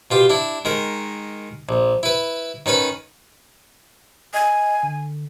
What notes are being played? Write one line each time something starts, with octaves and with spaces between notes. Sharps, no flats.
B2 F4 G4
D4 E4
D#3 G#3 A#4
A#1
E4 B4
D#3 C#4 B4 B5
D#5 G#5
D3